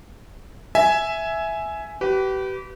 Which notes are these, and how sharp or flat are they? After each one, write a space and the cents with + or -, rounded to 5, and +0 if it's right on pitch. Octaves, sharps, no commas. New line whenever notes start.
E5 +0 G#5 +10
G4 -35 B4 +5